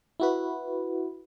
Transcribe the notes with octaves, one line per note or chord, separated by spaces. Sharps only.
E4 F#4 B4